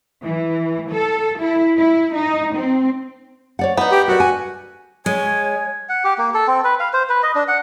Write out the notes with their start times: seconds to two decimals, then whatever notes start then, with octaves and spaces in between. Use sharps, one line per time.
0.22 E3
0.91 A4
1.41 E4
1.78 E4
2.16 D#4
2.56 C4
3.59 C#5 D5 F#5
3.77 B3 D#4 B4
3.92 G4
4.08 F#4 A4 A#4 D5
4.20 G#5
5.06 G#3 C#5 G#5
5.89 F#5
6.04 G4
6.18 A#3
6.34 A4
6.47 C4
6.64 B4
6.80 F5
6.93 C5
7.09 B4
7.23 D#5
7.35 D4
7.48 F#5